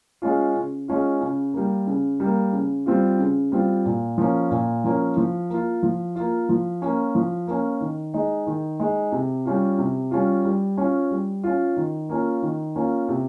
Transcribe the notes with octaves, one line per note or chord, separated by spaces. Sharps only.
G#3 C#4 F4
C#3
G#3 C#4 F4
C#3
G3 A#3
C#3
G3 A#3
C#3
G3 C4 F4
C#3
G3 C4 F4
A#2
F3 A#3 C#4
A#2
F3 A#3 C#4
F3
A#3 F4
F3
A#3 F4
F3
A#3 C#4
F3
A#3 C#4
D#3
G#3 D#4
D#3
G#3 D#4
C3
G3 C#4 F4
C3
G3 C#4 F4
G3
C#4 F4
G3
C#4 F4
D#3
A#3 C#4 F4
D#3
A#3 C#4 F4
C3